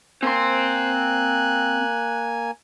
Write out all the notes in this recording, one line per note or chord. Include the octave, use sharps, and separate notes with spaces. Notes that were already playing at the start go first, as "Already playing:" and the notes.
A#3 C4 G#5 C6 F#6